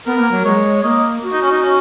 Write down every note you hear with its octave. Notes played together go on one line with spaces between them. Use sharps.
B3 A#4
A#3
F#3
G#3 C#5
A#3 D#5
F#4
D#4
C#4
D#4
C#4